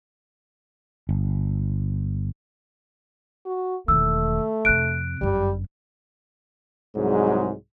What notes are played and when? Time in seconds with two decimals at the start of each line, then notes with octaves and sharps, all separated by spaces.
1.09 G1
3.45 F#4
3.88 E1 D#3 A3 E6
4.65 F2 C3 F#6 D7
5.21 G1 F#2 G3
6.94 C2 G#2 F#3 G#3